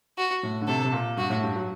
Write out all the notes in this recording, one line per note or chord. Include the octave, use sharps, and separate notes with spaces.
F#4
A2
D3
C3 A4
C3
A#2
G2 F#4
A2
G2
F#3